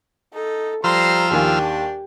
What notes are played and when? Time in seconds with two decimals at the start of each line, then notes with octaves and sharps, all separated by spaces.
0.34 D#4 A4
0.84 F3 G3 C5 A#5 C6 E6 F6
1.31 D#2 D#3 D4 G4 G#5